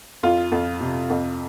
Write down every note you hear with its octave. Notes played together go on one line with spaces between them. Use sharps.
F2 F4
F2
C3
F2